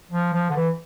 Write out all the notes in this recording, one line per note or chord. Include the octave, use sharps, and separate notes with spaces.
F3
F3
D3
E3